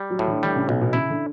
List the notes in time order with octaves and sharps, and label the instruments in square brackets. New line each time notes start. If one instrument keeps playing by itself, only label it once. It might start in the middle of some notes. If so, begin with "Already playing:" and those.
Already playing: [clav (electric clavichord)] G3
[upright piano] F#3
[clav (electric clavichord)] A2
[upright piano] D3
[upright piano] D3 [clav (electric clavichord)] G3
[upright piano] C#3
[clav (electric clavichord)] B1 [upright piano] B2
[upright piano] B2
[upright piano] C#3 [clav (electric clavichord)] E4
[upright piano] D3